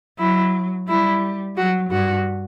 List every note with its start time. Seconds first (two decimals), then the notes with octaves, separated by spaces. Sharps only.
0.19 F#3 E4
0.88 G3 E4
1.56 F#3 F#4
1.90 G2 F#4